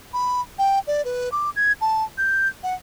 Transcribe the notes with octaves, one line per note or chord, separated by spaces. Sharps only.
B5
G5
D5
B4
D6
G#6
A5
G6
F#5